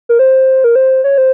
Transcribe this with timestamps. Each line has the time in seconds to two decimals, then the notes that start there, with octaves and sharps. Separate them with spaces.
0.09 A#4
0.19 C5
0.64 A#4
0.75 C5
1.04 C#5
1.18 C5